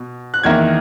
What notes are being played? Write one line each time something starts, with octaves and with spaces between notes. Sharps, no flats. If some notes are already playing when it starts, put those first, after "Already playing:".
Already playing: B2
F#6
E2 D#3 A#3 E4 G#6